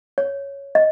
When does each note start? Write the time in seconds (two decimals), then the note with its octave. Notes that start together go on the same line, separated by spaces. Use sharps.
0.18 C#5
0.75 D#5